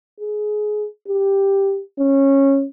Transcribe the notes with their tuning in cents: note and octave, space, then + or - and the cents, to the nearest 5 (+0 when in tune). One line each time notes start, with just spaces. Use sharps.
G#4 +20
G4 +5
C#4 -15